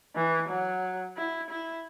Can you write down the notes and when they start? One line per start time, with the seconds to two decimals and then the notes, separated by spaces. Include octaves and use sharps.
0.16 E3
0.49 F#3
1.17 E4
1.50 E4